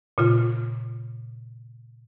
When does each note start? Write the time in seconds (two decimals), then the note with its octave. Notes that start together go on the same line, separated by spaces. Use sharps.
0.18 A#2 C#3 F4